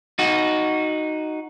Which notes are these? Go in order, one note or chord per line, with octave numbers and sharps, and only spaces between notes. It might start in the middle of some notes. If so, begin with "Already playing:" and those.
D#4 F#4